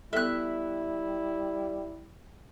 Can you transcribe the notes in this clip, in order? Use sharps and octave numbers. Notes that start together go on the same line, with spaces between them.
G3 B3 E4 A4 E5 F#6